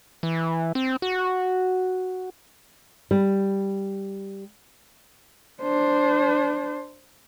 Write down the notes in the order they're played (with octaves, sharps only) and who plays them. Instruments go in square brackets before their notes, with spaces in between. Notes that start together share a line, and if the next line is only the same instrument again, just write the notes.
[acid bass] E3
C4
F#4
[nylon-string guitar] G3
[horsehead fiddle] D4 C5